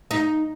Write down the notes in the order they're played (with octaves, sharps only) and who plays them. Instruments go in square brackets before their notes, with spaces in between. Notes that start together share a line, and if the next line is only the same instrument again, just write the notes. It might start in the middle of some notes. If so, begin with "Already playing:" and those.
[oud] D#4